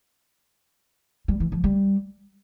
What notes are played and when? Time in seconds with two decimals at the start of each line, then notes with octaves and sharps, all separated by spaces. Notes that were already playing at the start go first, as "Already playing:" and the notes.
1.28 G3
1.40 E3
1.52 F3
1.64 G3